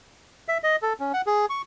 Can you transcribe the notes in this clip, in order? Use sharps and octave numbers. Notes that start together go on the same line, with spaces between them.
E5
D#5
A4
C#4
F#5
G#4
C#6